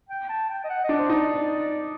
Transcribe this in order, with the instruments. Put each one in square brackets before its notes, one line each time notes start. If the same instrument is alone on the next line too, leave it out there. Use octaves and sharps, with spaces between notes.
[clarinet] G5
A5
G5
D#5
F#5
D#5
[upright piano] D4
[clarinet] C5
[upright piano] D#4 [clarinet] D5